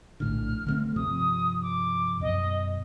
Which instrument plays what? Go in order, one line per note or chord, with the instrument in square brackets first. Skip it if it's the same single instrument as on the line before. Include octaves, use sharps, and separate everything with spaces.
[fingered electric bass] A#1 A2 D3 [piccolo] F6
[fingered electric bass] D3 A3 C4
[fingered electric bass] G2 C3 F3 [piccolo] D#6
[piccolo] D6
[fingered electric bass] F#2 B2 [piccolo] D#5